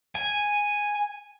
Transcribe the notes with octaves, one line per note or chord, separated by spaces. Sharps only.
G#5